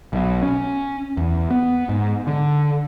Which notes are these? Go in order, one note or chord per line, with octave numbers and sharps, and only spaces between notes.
B1
C#4
E2
B3
G#2
D3